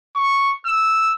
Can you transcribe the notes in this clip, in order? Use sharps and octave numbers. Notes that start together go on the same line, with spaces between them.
C#6
E6